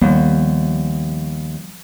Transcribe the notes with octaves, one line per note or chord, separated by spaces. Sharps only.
D#2 F3 G3 B3